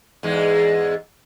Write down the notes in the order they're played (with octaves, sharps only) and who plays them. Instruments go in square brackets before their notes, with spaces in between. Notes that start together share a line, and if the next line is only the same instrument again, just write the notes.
[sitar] E2 G#2 G#3